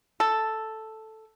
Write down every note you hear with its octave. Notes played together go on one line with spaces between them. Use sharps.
A4